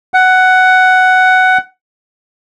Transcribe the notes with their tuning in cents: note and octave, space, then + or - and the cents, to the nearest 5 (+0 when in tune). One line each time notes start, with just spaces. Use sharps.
F#5 +10